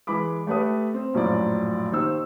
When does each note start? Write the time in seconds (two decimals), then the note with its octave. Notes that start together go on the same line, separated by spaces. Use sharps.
0.07 E3 G#3 B5 D6
0.47 A3 G4 A4 B4 D#6
0.94 C4
1.14 A#1 F#2 A2 F3 F4 D5
1.92 D#2 D#4 C5 E6